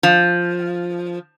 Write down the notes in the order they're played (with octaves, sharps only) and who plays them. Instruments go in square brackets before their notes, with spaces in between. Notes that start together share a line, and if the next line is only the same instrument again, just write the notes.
[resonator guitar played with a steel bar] F3